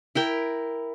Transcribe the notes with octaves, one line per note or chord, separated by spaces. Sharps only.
E4 A#4 G5